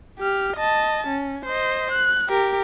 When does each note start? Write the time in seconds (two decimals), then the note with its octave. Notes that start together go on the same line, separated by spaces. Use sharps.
0.19 G4 F6
0.57 D#5 A5
1.08 C#4
1.46 C5 D#5
1.92 F#6
2.29 G4 A#4